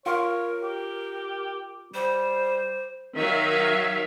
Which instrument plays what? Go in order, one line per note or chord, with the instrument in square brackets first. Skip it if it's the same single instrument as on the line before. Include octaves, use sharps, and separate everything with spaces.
[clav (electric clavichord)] F4 [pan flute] A#4 [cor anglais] C#5
[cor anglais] G4
[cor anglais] G3 [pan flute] C5
[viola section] D#3 F#3 E5 F5